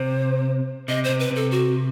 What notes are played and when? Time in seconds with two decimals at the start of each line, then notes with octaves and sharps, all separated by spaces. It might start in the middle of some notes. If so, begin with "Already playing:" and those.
Already playing: C3 C5
0.88 C3 D#5
1.04 C3 C5
1.20 B4
1.31 C3 A4
1.51 F#4